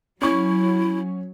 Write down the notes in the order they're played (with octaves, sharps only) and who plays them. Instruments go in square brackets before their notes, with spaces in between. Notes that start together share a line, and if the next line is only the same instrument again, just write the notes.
[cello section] F#3 [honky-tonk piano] C#4 C#6 [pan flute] E4